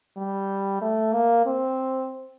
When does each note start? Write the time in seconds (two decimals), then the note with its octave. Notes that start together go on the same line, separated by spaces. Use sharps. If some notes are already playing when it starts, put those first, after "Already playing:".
0.17 G3
0.81 A3
1.13 A#3
1.46 C4